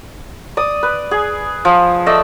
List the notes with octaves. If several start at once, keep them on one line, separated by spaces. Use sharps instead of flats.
D5 D#6
B4
G#4
F3
A3 D5 D#5 E6